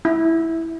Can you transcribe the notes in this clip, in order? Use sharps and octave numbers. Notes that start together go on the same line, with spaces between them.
E4